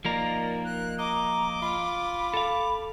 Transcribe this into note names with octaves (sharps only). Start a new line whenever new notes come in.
D#3 F3 A#3 A#4 D5
F#6
D#5 A#5 D6
F4 B5
A4 F5